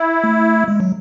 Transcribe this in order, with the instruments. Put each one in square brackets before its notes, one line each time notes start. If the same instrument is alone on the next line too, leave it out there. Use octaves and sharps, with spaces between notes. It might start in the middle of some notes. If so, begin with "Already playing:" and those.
Already playing: [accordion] E4
[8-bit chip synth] A3
G#3
F#3